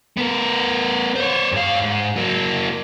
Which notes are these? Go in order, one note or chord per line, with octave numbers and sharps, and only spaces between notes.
B3 A#4
C5 C#5
G2 F5
G#2
F#3 A#3